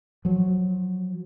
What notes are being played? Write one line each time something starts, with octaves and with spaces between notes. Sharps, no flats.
F3 F#3